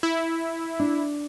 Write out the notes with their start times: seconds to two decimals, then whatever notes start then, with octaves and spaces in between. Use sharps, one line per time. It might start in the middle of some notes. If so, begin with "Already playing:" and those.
0.03 E4
0.79 D4